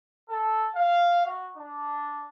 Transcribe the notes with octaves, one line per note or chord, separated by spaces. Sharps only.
A4
F5
F#4
D4